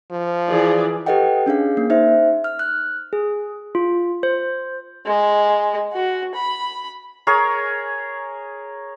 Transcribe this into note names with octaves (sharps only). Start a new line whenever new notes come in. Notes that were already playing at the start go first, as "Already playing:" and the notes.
F3
E3 G#4 D5
G4 A4 B4 D#5 F#5 G5
C#4 D4 G#4 F5
A#3
D#4 C5 E5
F6
F#6
G#4
F4
C5
G#3
F#4
B5
G#4 A#4 C#5